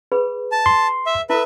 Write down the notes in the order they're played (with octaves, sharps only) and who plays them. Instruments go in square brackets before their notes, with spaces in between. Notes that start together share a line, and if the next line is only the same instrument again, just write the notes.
[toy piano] G#4 B4 B5
[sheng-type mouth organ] A5
[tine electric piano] C6
[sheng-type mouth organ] E5
[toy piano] E4 A4 [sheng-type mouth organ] B4 E5